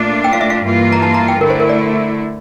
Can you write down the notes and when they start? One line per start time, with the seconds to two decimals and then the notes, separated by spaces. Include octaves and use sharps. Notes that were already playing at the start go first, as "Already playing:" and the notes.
Already playing: A#2 A3 D4 F4
0.24 G5
0.33 F5
0.41 E5
0.50 F5
0.63 G2 E3 A#3 F4
0.92 A#5
1.02 A5
1.14 A#5
1.28 G5
1.41 D3 A3 E4 A#4
1.50 C5
1.60 A#4
1.69 D5